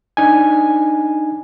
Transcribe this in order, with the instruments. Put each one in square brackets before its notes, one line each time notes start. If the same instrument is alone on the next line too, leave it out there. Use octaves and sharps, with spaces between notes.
[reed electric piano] D4 D#4 G#5